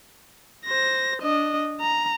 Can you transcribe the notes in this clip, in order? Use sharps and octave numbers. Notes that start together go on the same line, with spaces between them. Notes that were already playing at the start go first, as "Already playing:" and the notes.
C5 A#6
D4 D#5
A#5